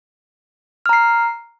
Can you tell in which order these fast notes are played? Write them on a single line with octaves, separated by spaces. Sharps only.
F6 A#5 C7